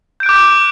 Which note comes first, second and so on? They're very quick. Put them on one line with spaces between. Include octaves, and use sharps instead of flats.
G6 D7 F#6 D6